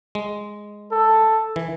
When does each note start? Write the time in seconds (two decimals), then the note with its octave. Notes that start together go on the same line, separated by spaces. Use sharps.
0.15 G#3
0.92 A4
1.56 E3